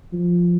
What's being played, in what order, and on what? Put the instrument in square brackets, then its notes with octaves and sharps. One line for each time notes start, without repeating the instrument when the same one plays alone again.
[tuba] F3